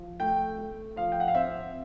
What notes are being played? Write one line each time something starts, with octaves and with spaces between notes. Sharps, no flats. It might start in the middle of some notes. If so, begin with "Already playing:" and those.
Already playing: F3
A3 G5
A3
F3 F5
G5
F#5
F5
C4 E5